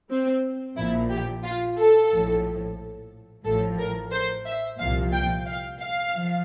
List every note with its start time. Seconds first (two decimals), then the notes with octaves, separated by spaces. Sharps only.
0.10 C4
0.76 A#1 A#2 F3 E4
1.10 G4
1.43 F4
1.78 A4
2.11 A#1 A2 F3
3.44 A1 A2 F3 A4
3.79 A#4
4.11 C5
4.45 E5
4.79 C2 A#2 F3 F5
5.12 G5
5.46 F5
5.80 F5
6.14 F3